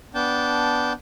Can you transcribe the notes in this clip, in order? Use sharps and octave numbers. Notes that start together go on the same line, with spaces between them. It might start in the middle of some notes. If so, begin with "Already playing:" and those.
B3 D4 G5 A5